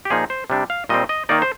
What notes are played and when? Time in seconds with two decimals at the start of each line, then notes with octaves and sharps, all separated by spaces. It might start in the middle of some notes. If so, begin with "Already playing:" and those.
0.05 G4
0.10 A#2 F3 A#3 D#4 G#4
0.30 C5
0.50 C3 G3 D4
0.70 F5
0.89 A#2 G3 C4 D#5
1.09 D#5
1.29 D#3 A#3 D#4 D5
1.42 C5